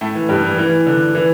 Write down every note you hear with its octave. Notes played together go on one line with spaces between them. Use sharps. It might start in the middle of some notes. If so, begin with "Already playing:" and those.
A2 A3
E3
G2 G3
E3
E3
D3
E3